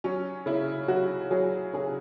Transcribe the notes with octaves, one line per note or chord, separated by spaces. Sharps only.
F#3 C#4
C#3 E4
F#3 F#4
F#3 G#4
C#3 G#4